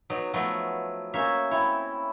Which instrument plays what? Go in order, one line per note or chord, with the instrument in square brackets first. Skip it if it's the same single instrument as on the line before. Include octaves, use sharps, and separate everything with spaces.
[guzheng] F#3 B3 D#4
[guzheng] F3 F#3 A3 [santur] B3
[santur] A#3 C#4 D#5 [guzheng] C5 C#5 E5
[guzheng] C4 C#5 [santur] E4